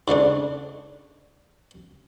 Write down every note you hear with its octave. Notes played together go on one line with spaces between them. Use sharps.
G#2 C#3 A3 D4